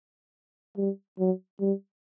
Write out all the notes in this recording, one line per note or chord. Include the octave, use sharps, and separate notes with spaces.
G3
F#3
G3